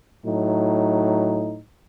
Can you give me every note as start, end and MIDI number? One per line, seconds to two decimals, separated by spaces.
0.25 1.59 45
0.25 1.59 54
0.25 1.59 63